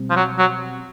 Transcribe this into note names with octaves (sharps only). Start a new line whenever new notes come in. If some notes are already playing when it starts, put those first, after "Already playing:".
Already playing: B2 G3 C4
F3
F#3
F#3